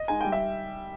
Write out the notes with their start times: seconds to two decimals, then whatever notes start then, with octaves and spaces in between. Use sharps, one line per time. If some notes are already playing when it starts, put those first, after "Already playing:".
Already playing: D#5
0.08 G#3 D#4 G#5
0.21 G3 G5
0.32 E5